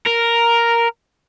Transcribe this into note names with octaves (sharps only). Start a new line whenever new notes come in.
A#4